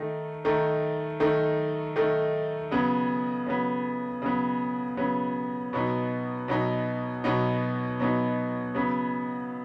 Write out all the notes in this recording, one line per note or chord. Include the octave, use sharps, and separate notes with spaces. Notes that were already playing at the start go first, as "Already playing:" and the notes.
Already playing: D#3 A3 D#4
D#3 A3 D#4
D#3 A3 D#4
D#3 A3 D#4
C#3 F#3 B3
C#3 F#3 B3
C#3 F#3 B3
C#3 F#3 B3
B2 F#3 B3 D#4
B2 F#3 B3 D#4
B2 F#3 B3 D#4
B2 F#3 B3 D#4
C#3 F#3 B3